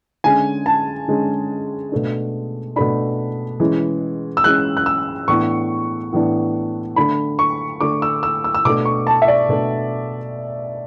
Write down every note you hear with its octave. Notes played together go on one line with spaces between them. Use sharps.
D3 G#3 C#4 G#5
A5
D3 G#3 C#4
B2 A3 D4
B2 A3 D4 B5
E3 G#3 C#4
E6
E3 G#3 C#4 F#6
F#6
E6
A2 E3 B3 D4 C#6
A2 E3 B3 D4
D3 A3 D4 B5
C#6
D3 A3 D4 D6
E6
E6
E6
E6
B2 A3 D4 D6
C#6
A5
E5
D5
B2 A3 D4